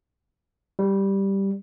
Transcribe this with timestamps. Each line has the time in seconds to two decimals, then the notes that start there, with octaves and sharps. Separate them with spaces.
0.79 G3